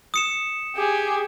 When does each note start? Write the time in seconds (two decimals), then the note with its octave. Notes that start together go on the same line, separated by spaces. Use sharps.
0.14 D#6 C#7 E7
0.76 G4 G#4